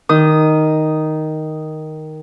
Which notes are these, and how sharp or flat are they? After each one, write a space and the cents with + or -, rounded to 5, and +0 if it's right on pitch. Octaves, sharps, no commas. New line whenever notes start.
D#3 +0 D#4 +0 D#6 +0